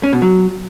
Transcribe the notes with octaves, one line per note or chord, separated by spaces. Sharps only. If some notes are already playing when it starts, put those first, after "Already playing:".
C#4
B2
F#3